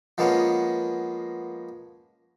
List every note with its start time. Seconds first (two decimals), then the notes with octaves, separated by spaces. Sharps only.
0.18 F3 G#3 A#3 B3 C#4